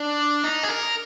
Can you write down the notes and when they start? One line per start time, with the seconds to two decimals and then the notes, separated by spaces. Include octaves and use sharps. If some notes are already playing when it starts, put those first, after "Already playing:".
Already playing: D4
0.44 D#4
0.63 G#4
0.69 A#4